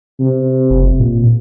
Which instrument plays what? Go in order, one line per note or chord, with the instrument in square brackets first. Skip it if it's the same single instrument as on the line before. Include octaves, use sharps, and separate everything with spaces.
[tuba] C3
[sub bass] F#1
A#2